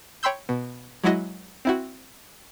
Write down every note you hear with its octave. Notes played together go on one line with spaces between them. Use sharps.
C#5 G5 B5 C6 E6 G6
B2
F#3 G#3 E4 F#4 D#5
C4 E4 F#4